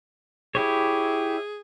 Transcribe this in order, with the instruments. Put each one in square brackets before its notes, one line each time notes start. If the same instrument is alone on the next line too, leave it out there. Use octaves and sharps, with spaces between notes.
[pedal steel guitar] E4 G4 C#5 [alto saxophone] G#4